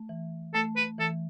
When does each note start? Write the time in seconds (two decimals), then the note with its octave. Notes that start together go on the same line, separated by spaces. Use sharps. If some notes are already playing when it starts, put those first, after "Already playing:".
Already playing: A3
0.09 E3
0.54 A3 A4
0.77 B4
0.98 E3 A4